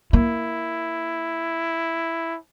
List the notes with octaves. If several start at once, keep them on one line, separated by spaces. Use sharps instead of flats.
A#3 E4